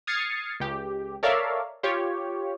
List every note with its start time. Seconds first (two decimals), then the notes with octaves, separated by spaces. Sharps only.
0.07 D#6 F6 G#6 A6 C7 C#7
0.60 C#2 G4
1.23 A4 A#4 C#5 D5 E5 F5
1.83 F4 G4 C#5